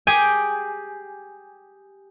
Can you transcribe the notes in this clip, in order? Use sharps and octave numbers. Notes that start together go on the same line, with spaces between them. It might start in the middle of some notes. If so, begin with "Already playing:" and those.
G4 G#4 G5 G#5